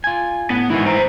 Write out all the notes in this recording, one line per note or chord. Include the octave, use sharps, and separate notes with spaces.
F4 G#5
A2 B3
G#2 D#3 E3 G#3 E4
C5 A#5